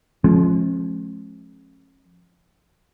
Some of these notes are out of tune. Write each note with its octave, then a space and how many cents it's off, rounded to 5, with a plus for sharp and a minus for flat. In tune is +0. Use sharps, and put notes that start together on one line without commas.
F3 +0 G#3 +40 C#4 -35